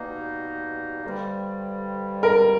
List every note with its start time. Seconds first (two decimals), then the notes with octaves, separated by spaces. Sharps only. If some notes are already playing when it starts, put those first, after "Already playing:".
Already playing: B2 G3 A#3 D#4
1.03 G2 D3 G3 C4
2.23 A#4